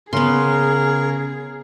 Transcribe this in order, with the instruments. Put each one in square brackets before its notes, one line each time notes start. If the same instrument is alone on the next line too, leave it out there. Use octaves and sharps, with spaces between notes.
[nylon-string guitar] C#3 [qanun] B3 C6 [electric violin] G#4 [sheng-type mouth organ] A#4